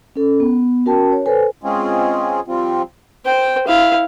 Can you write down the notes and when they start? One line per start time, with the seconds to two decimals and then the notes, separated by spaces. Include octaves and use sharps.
0.16 C#4 A4
0.40 B3
0.85 C#4 F#4 A#4 G5 A5
1.12 C#5
1.26 A4 B4 C5 G#5
1.64 G#3 C4 C#4 F4 G#4
2.48 F3 G3 C4 F4
3.25 C5 G5
3.68 E4 F5